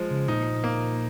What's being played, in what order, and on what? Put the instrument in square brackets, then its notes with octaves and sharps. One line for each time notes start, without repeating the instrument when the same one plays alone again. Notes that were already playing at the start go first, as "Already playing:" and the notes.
Already playing: [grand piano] F3 G#3
[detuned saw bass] C#3
[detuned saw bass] A#2 [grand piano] D#4
[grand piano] A#3